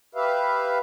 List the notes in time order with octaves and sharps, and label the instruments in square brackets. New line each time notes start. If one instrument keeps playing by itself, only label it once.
[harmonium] G4 B4 E5 F5